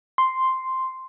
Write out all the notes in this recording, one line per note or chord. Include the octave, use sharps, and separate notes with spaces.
C6